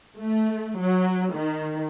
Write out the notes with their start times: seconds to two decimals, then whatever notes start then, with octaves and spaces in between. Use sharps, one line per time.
0.17 A3
0.77 F#3
1.33 D#3